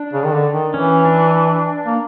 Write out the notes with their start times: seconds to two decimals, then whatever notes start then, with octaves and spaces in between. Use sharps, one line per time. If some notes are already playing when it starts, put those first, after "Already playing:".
Already playing: D4
0.13 C#3
0.25 D#3
0.33 D3
0.53 D#3
0.74 E3 C#4
1.05 D4
1.86 A#3